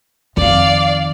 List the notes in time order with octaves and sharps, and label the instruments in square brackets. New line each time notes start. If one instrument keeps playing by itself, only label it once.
[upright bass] F2 D#3 [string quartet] D5 F5